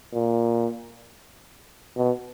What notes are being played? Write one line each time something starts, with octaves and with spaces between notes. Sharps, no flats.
A#2
B2